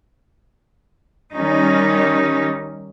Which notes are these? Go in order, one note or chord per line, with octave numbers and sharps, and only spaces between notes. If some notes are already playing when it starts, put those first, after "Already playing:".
D#3 G3 C#4 D#4